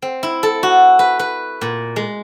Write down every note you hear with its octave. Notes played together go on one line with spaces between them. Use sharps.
C4
E4
A4
F#4
B4
B4
A#2
G#3